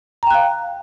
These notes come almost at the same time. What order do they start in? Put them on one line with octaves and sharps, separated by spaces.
A#5 G5 F#6 F5